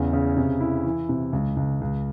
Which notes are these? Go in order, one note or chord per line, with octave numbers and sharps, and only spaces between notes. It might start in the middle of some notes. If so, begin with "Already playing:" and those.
Already playing: E2 C#3
C#3
C3
E4
E3
C3
C#2
C#2
C#2